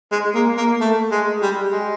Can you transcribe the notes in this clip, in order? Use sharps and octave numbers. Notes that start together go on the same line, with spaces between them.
G#3
A#3
A#3
A3
G#3
G3
G#3